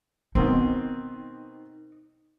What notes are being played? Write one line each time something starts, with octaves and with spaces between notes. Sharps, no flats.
B2 D#3 C4 D#4